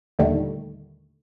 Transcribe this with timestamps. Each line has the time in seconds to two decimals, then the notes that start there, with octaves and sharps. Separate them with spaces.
0.19 D#2 A#2 D3 D#3 G3 A3